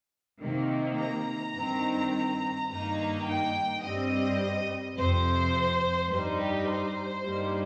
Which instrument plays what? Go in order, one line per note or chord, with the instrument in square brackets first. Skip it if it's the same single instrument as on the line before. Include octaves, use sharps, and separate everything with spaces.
[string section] C3 D#3 A#3
A#5
G2 D#3 C4
G2 D#3 A#3 D#4 A#5
G5
G2 G3 C4 D#5
F2 C3 F3 C5
G2 G3 D#4 C5
G4
C5
G2 G3 A#3 D#4